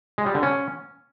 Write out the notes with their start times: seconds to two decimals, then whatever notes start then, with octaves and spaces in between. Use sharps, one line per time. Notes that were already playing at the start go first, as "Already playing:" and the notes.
0.18 G#3
0.26 G3
0.34 D3
0.43 C#4